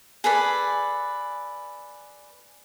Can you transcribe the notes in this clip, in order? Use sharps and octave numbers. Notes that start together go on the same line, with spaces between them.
G#4 A4 B4 D5